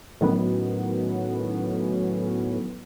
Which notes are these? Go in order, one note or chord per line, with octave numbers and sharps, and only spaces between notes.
A2 D#3 F#3 B3 C#4